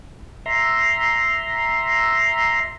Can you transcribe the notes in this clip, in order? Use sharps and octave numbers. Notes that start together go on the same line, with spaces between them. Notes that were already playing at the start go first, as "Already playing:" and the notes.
E5 A#5 C6